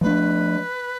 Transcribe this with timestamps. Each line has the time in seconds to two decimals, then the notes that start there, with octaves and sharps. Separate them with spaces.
0.01 F3 A3 D4 B4